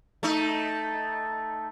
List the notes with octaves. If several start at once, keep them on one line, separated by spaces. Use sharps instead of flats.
A3 D#4